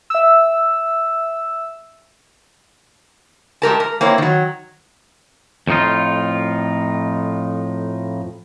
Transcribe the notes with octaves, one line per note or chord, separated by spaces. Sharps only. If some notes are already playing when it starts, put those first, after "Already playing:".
E5 E6
G#3 G4 A#4 A5
A#4
A#3 C4 E4 C#5
D#3 F#3
F2 A2 D#4 F4